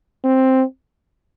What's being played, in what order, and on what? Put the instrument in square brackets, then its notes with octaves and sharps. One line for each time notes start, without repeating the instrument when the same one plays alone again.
[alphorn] C4